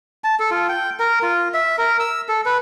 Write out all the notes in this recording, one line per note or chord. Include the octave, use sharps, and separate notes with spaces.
A5
A4
F4
G5
A#4
F4
E5
A#4
E6
A4
B4